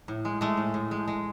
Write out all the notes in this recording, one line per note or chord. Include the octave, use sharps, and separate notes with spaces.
A2
G#3
G#3 A3
A2
A2
G#3
G#3